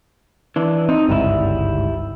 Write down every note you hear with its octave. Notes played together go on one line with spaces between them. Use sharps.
E3 D4
C4 D#4
G1 C#2 G#2 G3 E4